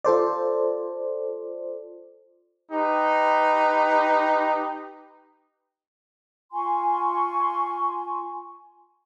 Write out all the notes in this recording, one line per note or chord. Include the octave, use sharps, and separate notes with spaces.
F4 A4 C5 D5
D#4 G4 B4
F4 G#5 C6 C#6